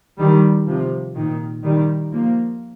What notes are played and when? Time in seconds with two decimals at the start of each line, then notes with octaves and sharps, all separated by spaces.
0.18 D#3 G3
0.66 C3 F3
1.14 A#2 D#3
1.63 D#3 G3
2.11 F3 A#3